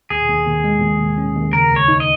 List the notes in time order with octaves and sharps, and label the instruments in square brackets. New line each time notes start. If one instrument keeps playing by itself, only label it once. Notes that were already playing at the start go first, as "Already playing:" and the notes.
[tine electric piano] D#2 [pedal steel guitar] G#4
[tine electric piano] D#2
D#2
G#3
D#2
D#2
C#4
D#2
[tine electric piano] C#3 [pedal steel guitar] A#4
[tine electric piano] C#2
[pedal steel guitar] C#5
[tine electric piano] D#4
[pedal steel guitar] D#5